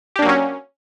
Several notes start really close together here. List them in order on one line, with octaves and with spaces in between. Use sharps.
G4 D4 A#3 F#3 C#4